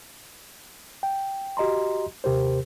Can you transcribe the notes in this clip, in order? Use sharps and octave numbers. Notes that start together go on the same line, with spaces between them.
G5
F#4 G4 D#5 A#5 C6
D#2 C3 G4 A#4 C5